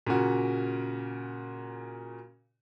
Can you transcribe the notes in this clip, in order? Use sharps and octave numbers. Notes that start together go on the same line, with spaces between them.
A#2 C#3 F#4